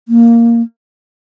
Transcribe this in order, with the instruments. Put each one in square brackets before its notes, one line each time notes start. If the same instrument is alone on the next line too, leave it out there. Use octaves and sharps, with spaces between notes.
[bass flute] A#3